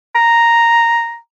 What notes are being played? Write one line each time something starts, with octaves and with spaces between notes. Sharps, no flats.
A#5